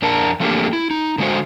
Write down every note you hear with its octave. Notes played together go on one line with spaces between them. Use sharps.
F2 D4 A#4 A5
F3 A3 A#3 C4 D4 G4
E4
D#4
D3 G#3 F#4 C5